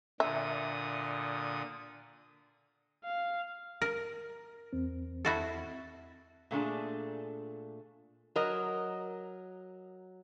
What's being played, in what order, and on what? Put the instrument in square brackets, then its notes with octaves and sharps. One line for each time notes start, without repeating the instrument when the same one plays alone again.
[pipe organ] A#2 D3 D#6 [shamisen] E5
[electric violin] F5
[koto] A#4
[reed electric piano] E2 C4
[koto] E4 F#4 A4
[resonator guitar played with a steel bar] A#2 A3 D4 G#4
F#3 A#4 D#5